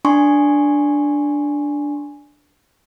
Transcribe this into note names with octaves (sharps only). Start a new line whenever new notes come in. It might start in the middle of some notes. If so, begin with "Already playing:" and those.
D4 G#5 C6 C#6